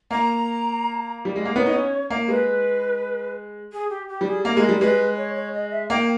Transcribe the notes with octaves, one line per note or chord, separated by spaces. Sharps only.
A#3 A#5
G3
G#3
A#3
B3 C#5
D#4
C#4
A#3
G#3 B4
G#4
G4
G4
G3
G#4
A#3 A#4
G#3
G3
G#3 B4
C#5
C#5
D#5
E5
A#3 G5